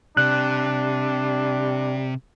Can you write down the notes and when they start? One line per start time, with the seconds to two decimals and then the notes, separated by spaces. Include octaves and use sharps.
0.17 C3 G3 D4 F#6